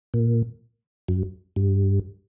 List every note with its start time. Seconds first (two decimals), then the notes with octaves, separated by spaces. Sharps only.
0.14 A#2
1.08 F#2
1.56 G2